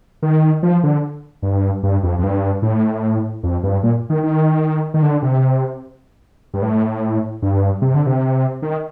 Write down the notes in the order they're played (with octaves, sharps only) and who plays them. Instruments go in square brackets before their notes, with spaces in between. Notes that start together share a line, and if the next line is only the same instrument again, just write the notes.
[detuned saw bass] D#3
F3
D3
G2
G2
F2
F2
G2
A2
F2
G2
A#2
D#3
D#3
D#3
D3
C3
G2
A2
G2
C3
D3
C3
D#3